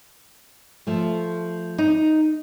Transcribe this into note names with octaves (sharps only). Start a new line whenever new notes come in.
F3 A3
D#4